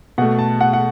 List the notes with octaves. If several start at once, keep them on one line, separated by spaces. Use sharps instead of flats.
B2 A3 F#5
A5
F#5
F#5